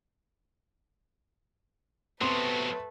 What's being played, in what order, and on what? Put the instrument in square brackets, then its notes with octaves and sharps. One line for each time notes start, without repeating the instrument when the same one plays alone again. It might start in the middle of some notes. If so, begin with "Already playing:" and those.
[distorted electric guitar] C3 F#3 [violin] A3 B4 [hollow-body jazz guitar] B3 C4 [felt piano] C6